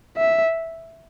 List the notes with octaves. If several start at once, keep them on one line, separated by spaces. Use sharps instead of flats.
E5